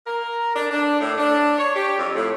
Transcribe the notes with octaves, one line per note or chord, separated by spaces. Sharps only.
A#4
D4
D4
A2
D4
C#5
G4
F2
A2